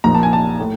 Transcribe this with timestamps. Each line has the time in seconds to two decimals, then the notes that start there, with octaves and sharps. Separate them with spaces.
0.04 A#1 A#2 F3 A#5
0.15 A5
0.23 G#5
0.33 A5
0.60 A2